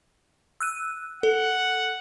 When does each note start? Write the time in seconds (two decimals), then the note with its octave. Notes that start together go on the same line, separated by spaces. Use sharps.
0.60 E6 F#6 D#7
1.23 A4 F#5